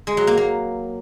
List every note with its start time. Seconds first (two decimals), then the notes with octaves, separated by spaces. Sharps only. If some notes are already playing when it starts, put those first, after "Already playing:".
0.07 G#3
0.17 F#3
0.27 A#3
0.37 A#3